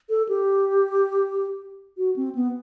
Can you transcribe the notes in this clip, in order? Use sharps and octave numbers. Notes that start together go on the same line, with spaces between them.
A4
G4
F#4
C4
B3